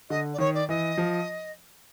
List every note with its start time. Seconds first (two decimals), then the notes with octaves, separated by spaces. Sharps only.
0.10 D3 D#5
0.34 D5
0.39 D#3 C#5
0.54 D5
0.69 E3 D#5
0.98 F3